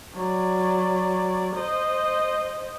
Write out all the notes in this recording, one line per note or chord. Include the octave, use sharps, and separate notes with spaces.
F#3 D5
C5 D#5